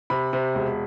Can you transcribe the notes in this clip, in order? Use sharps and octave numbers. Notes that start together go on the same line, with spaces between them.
C3 B5
C3
E1